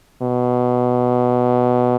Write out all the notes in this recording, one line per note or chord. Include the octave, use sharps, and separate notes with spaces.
B2